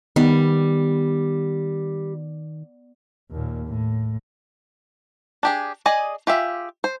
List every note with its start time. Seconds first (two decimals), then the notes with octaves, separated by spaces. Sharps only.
0.16 D#3 G3 B3
3.31 D#2 A#2
3.66 A2
5.43 D4 G4 G#4
5.86 G#4 D5 D#5 G#5
6.27 F4 G4 G#4 E5
6.84 C5